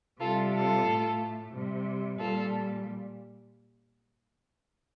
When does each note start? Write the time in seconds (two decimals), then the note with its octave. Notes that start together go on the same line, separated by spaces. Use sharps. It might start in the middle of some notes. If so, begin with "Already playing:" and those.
0.20 C3 G3 F4 A4
0.53 F4 A4
0.86 A2 A3
1.52 C3 G3
2.18 A#2 G3 F4 A4